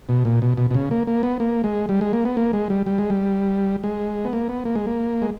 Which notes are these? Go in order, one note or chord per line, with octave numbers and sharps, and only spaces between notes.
B2
A#2
B2
B2
B2
C#3
A#3
A#3
B3
A#3
G#3
G3
G#3
A#3
B3
A#3
G#3
G3
G3
G#3
G3
G#3
B3
A#3
B3
A#3
G#3
A#3
G#3